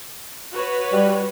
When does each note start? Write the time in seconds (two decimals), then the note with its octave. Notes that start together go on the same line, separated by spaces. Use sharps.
0.52 F#4 B4 C#5
0.92 G3